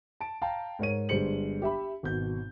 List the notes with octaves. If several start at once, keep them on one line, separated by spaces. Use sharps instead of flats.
A5 D7
F5 G5 A5 A#5
G#2 A#4 C#5 D#7
G1 G3 G#3 C5 C#7 F#7
G4 E5 B5
G#1 B2 G6